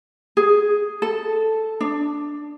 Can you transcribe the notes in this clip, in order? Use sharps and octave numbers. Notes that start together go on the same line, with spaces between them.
G#4
A4
D4